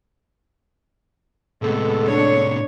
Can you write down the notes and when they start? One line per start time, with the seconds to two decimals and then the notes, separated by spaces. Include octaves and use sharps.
1.62 A2 C3 G#3 B3 A4
2.07 D4 C#5